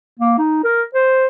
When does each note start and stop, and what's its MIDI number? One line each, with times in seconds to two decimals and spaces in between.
0.20 0.33 58
0.38 0.62 63
0.64 0.83 70
0.94 1.27 72